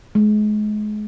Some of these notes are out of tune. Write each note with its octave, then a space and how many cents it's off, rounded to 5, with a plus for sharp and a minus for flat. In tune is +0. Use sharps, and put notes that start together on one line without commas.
G#3 +30